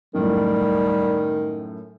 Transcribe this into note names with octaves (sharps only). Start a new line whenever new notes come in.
F#2 A2 D#3 G3